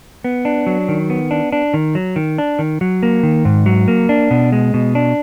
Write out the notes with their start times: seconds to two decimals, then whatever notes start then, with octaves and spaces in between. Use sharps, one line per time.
0.24 B3
0.45 D4
0.67 F#3
0.88 D#3
1.10 B3
1.31 D4
1.52 D4
1.74 D#3
1.95 F#3
2.16 D#3
2.38 D4
2.59 D#3
2.81 F#3
3.03 A#3
3.23 D#3
3.45 G#2
3.66 F#3
3.88 A#3
4.09 D4
4.31 B2
4.52 G#3
4.74 B2
4.95 D4